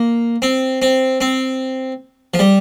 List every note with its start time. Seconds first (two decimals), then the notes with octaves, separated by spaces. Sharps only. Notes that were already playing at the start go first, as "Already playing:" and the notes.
Already playing: A#3
0.42 C4
0.82 C4
1.21 C4
2.34 F3
2.39 G3